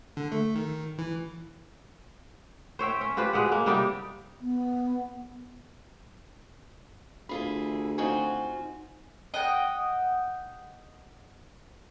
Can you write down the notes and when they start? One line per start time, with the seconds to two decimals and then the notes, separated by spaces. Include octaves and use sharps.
0.17 D3
0.32 A3
0.55 D#3
0.98 E3
2.79 C5 C#5 E5 G5
3.01 C#4
3.17 F4 G4 B4 C5
3.33 B2 G#3 F#5
3.52 A#3
3.66 C3 G3 D#4 G4
4.40 B3
7.29 D2 E4 F4 G#4 B5
7.98 C4 D#4 F4 F#4 G#5
9.34 D#5 F#5 G5